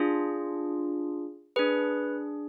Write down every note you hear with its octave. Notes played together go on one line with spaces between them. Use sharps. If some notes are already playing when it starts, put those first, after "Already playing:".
Already playing: D4 F4 G#4
D4 G#4 B4